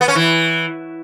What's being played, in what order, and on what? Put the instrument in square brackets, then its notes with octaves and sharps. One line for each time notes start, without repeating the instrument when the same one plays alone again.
[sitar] B3
C#4
E3